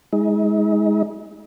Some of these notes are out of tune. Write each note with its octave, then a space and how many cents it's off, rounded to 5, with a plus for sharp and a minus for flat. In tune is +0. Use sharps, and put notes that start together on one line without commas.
G#3 +0 D#4 +40